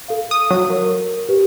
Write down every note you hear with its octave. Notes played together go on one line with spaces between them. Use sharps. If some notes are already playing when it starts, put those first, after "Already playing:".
A4 F5
D#6
F#3
A#4
G4 B4